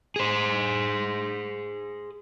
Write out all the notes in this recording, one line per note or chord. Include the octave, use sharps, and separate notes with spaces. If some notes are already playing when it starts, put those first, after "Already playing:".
G#4 C5